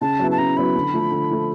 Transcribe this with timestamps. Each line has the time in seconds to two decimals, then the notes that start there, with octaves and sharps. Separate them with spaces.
0.01 C#3 A5
0.19 F#3 B3 E4
0.31 A5
0.38 C#3 A#5
0.56 F#3 B3 E4 B5
0.75 D3
0.93 F3 A3
1.11 D3
1.31 F3 A3